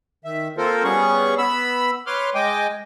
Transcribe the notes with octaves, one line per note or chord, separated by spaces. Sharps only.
D#3 E5
A#3 C4 F4 A4 A#4 C5
G3 B3 C#4 G#4 C#6
B3 B5 E6
B4 C#5 C6 D6 F6
G#3 D#5 G5 G#5 D6